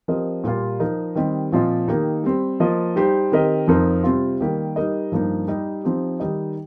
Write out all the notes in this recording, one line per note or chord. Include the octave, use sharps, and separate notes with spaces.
F3 C4 G4 A#4 D#5
A#2 G3 A#3 F4
F3 D#4 A#4 D#5
D#3 G3 C4 G4 D#5
A#2 F3 C4 F4 D#5
D#3 A#3 D#4 G4
G3 C4 G4
F3 A#3 F4 D#5
G3 D#4 G4 C5
D#3 C4 G4 A#4 D#5
F2 F3 C4 D#4 A#4
C3 G3 C4 F4
D#3 G3 A#3 G4
G3 D#4 A#4 D#5
G2 F3 A#3 D#4
G3 D#4 G4 D#5
F3 C4 D#4 G4
D#3 G3 D#4 G4 D#5